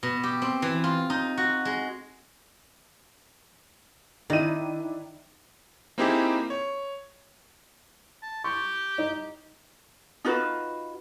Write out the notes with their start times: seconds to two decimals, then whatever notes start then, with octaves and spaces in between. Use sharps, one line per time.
0.03 B2
0.23 G4
0.42 C4
0.62 E3
0.84 F4
1.10 D#4
1.37 F#4
1.65 G#3
4.30 D#3 D4 E4 D#7
5.98 A#3 C4 D#4 E4 G4 G#4
6.50 C#5
8.23 A5
8.44 G4 C#6
8.98 D#4
10.25 D#4 F4 F#4 B4